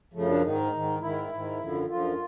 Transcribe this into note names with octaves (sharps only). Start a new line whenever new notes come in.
F#2 C#3 F3 A3
D4
G#2 D#3 D#4
G#2 D#3
G#2 D#3 E4
G#2 D#3
F#2 D3 F3
F#2 D3 F3 F4